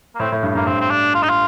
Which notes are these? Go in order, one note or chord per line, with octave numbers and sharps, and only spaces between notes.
A#3
A2 C4
A2
G2
G2 A#3
G2 C4
C4
D4
F4
D#4
F4